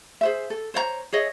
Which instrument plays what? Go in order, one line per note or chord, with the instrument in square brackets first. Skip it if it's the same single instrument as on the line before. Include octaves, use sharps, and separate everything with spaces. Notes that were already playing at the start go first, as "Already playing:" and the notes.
[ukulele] G#4 C5 E5
A4
C5 C#5 F5 A#5
G#4 C#5 D#5 E5